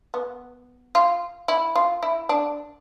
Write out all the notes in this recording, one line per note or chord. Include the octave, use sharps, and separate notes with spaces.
B3
F4
E4
F4
E4
D4